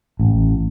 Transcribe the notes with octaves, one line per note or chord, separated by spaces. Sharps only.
A1